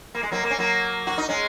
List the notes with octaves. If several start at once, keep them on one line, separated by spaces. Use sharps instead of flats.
A#3
G#3
F#3 A#3
A#3
C#4
F#3 A#3
F#4
D#4
G#3 C#4